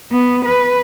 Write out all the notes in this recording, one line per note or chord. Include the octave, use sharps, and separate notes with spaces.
B3
B4